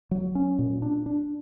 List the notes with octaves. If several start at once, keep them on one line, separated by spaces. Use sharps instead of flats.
F#3
C#4
A#2
D4
D4